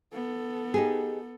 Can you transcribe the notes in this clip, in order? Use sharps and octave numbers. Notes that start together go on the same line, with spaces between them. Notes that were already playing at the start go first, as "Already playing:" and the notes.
B3 A4
D#4 G4 G#4